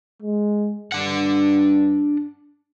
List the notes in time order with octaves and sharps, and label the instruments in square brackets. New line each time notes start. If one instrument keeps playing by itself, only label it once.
[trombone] G#3
[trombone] G2 [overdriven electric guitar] D4 F#5